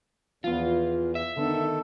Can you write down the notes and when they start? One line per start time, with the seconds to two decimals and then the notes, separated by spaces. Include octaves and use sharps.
0.44 E2 F3 B3 F4
1.15 E5
1.37 D3 D#3 B3 A4